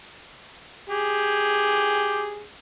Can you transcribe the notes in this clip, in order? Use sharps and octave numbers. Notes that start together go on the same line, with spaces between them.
G4 G#4